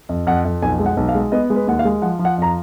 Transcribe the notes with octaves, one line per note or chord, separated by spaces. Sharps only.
F2
F2 F#5
F2
B1 G#5
G#3
F#5
B1
F5
G#3
B3 D#5
G#3
B4
D#2 F#5
F5
G#3
F3 F#5
F3
F#5
F2 A#5